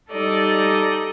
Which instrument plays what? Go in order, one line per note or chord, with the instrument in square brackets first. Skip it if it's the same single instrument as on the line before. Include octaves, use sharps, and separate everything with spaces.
[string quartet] G3 D#4 A4 D5 D#5